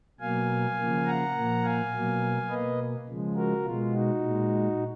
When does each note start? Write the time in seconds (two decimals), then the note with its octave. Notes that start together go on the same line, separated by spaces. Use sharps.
0.20 B2 F#3 A#3 F5 G#5
0.78 C#3 F3 A#3
1.06 F#5 A#5
1.35 A#2 F3 A#3
1.63 F5 G#5
1.92 B2 F#3 A#3
2.49 B2 A#3 B4 D#5
3.08 C#3 F3 G#3
3.36 F#4 A#4
3.64 B2 G#3 F4
3.93 D#4 F#4
4.22 A#2 G#3